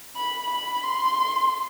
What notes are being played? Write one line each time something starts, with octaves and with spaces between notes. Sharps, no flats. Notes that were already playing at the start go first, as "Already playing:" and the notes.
B5
B5
C6